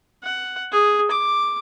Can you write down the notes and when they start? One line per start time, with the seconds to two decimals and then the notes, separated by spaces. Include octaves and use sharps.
0.24 F#5
0.72 G#4
1.11 D6